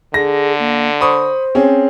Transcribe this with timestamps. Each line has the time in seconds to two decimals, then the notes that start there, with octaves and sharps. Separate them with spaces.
0.14 D3 G#4 A#6
0.59 A#3
1.01 C5 B5 C#6 D#6
1.55 C4 C#4 G#4